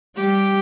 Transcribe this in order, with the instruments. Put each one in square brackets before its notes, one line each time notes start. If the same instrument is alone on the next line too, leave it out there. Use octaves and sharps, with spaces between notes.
[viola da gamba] G3 [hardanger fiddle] G4